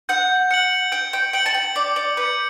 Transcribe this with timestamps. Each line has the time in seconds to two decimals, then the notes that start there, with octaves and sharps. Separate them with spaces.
0.09 F#5 G6
0.50 F#5 C#7 F#7
0.92 G5 G6
1.13 G5
1.33 G5 C#7 F#7
1.46 A5
1.54 G5
1.76 D5 D6
1.96 D5
2.17 B4 G6 C#7